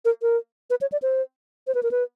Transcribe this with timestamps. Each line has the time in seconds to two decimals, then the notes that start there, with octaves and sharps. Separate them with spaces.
0.05 A#4
0.22 A#4
0.70 B4
0.81 C#5
0.92 D5
1.02 C5
1.67 C5
1.75 B4
1.83 A#4
1.91 B4